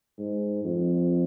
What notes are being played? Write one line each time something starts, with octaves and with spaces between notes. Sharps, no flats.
G#2
F2